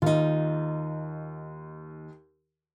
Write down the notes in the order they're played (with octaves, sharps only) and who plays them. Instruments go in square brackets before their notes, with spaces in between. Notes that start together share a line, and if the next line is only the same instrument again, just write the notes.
[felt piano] D#2 [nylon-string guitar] D#4 F4